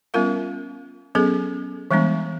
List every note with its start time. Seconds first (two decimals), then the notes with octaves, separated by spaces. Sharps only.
0.14 G3 B3 C#4 F4 A#4 F5
1.15 F#3 B3 C#4 G#4 A4
1.91 E3 G3 G#3 B3 D4